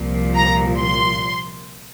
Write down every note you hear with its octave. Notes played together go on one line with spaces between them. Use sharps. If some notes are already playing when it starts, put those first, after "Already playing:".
Already playing: C2 A#2 F3
A#5
C6